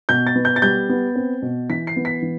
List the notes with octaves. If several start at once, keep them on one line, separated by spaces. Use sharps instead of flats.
B2 G6
A6
B3
G6
A6
G3 G6
B3
C4
B2
E3 B6
C7
B3
B6
E3